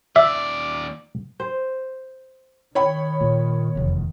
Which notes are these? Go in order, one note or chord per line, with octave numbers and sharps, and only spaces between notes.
D#2 D5 E5
C5
D#3 C#5 G5 B5
A#2
F1 E2